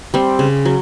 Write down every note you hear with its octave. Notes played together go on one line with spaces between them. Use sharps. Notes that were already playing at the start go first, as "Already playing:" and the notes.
G3 C4
C#3
F#3